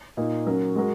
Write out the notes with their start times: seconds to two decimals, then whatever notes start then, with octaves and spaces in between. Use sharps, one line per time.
0.17 A#2 A#3 D#4
0.47 F#3 C#4 F#4 A#4
0.76 G#3 F#4 A#4